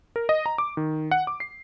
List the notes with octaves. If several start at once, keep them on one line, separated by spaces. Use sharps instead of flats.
A#4
D#5
A#5
D6
D#3
F#5
D6
C7